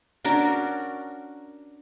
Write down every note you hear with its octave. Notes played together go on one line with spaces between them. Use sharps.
C#4 D4 F#4 A#4